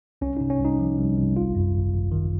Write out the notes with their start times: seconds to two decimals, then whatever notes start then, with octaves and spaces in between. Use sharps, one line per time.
0.21 C2 C#4
0.37 C3 D#4
0.50 C#4
0.60 C2 D#4
0.79 F3
0.98 C2
1.17 C2
1.36 G#1 F4
1.55 F#2
1.74 G#1
1.93 G#1
2.12 D#3